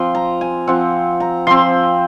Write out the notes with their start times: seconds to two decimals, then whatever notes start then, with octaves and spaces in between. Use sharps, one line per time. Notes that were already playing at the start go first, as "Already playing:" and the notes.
Already playing: F3 C4 C6
0.15 A#5
0.41 G#5
0.67 F3 C4 F#5
1.20 A#5
1.47 F3 C4 C6